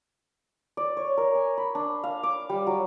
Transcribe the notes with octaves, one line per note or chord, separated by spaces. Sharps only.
D5
C#5
A#4
G#5
B5
D4
F5
D6
G3
F#3